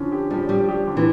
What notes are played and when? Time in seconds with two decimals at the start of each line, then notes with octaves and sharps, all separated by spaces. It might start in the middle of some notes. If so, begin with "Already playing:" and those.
Already playing: D3 F3 C#4
0.12 G4
0.30 F3 G3
0.49 G3 G4
0.69 G4
0.87 D3
0.97 E3